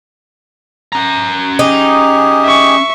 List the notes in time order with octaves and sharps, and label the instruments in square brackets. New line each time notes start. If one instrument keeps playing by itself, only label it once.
[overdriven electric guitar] C#4 A#5
[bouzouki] D#4 [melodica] G4 G#4
[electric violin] E5 C#6